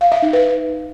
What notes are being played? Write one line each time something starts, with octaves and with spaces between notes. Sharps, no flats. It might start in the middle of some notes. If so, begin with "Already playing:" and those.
F5
E5
D#4
B4